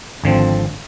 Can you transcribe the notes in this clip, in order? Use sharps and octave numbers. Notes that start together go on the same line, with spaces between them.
G#1 D3 F3 C4